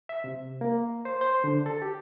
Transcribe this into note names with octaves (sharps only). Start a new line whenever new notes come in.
E5
C3
A#3
C5
C5
D3
A4
G4